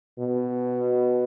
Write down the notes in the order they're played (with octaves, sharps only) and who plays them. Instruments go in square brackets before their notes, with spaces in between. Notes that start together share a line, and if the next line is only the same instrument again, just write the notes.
[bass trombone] B2